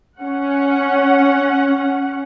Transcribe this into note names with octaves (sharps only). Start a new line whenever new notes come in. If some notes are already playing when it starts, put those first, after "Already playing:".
C#4 F#5